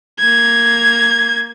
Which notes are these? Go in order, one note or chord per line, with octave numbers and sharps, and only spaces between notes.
A#3 G#6